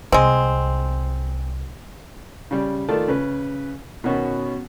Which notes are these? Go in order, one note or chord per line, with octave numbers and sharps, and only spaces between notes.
C2 G#3 C4
C#3 G3
D#3 A3 F4 D5 A5
C#3 B4
B2 D#3 B3 C#4 F#4